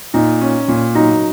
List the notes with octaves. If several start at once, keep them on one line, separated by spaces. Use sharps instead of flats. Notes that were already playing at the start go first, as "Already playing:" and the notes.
A#2 D#4
C#4
A#2
F#3 D#4